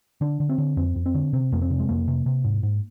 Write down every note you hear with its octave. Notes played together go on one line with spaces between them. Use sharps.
D3 D4
D3
C4
D3
F2 C4
F2
C4
D3
C3 C4
F2 A#3
C4
C3
G#3
F2 A#3
C3
C3
G#2
G#2